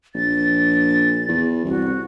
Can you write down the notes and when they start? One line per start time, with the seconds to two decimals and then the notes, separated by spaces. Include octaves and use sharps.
0.15 A#1 A6
1.29 E2
1.65 C2 F#4